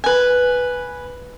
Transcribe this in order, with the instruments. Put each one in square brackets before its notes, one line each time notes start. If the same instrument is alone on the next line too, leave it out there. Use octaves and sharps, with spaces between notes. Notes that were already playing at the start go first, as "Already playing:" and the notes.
[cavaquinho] B4 G#5